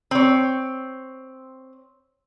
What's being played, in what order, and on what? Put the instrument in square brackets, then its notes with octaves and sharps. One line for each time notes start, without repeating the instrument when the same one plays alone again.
[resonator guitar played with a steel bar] C4 C#5